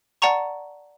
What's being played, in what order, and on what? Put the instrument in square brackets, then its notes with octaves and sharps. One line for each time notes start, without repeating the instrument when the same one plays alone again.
[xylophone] D5 F#5 A5 A#5 C#6